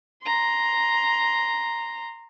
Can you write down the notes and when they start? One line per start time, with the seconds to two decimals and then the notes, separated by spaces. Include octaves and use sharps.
0.22 A#5 C6